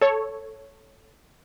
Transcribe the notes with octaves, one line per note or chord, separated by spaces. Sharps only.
A4 C#5